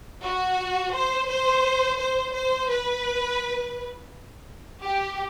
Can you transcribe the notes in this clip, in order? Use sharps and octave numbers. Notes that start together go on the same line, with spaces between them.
F#4
C5
C5
C5
C5
B4
G4